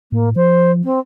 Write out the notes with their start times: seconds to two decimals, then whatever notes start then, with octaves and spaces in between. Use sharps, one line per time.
0.12 A2 A#3
0.36 F3 C5
0.84 C4